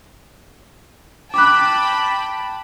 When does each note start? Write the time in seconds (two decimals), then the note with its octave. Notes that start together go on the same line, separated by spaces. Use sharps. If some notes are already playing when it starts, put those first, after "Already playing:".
1.34 G5 A5 B5 D6 F#6